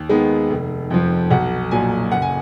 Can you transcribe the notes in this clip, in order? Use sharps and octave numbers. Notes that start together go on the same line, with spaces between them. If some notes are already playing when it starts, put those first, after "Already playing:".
Already playing: D#2
D#3 G#3 B3
F1
F2 F3
B1 F#5
A#2 F#3 G#5
F#1 F#5
G#5